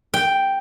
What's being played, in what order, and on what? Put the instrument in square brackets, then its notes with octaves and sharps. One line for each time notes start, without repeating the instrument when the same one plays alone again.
[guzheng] G5